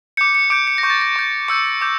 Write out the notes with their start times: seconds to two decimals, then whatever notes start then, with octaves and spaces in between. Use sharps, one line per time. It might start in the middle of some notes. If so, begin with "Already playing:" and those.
0.17 D6 G6 C#7
0.35 C#7
0.50 D6 G6 D7
0.67 C#7
0.78 A#6
0.83 C#6 G6
0.90 A6
1.01 A#6
1.16 C#6 G6
1.48 C#6 E6 G6 C#7
1.81 D6 G6